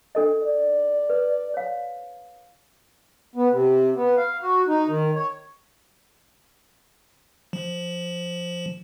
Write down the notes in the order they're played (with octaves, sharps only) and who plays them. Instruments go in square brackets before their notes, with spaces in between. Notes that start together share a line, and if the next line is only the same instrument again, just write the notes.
[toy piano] D4 A4 D#5
[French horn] D5
[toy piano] B4
C#5 F5
[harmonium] B3
C3
B3
F5
F#4
D#4
D#3
C#5
[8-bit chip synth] F3